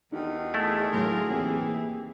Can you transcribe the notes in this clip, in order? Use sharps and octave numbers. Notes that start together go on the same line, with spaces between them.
E2 D#3 D#4 F#4 G4
A3 E4 G#4
D2 A2 F#3 F4 A#4
D#2 E3 C4 G4